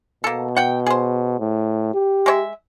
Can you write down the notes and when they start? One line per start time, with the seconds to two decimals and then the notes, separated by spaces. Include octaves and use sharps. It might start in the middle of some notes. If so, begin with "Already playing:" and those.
0.24 B2 A#3 A4
0.57 F#5 G5
0.86 G#4 C5
1.39 A2
1.94 G4
2.26 G#3 C#5 E5